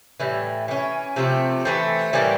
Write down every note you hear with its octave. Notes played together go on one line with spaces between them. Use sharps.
A2 E3 G3
E3 A3 C#4
C3 F3 A3 C4
E3 A3 C4
A2 E3 G3 A#3